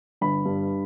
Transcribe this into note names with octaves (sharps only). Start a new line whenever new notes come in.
G1 B5
G2